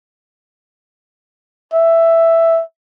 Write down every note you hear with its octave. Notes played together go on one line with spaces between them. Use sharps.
E5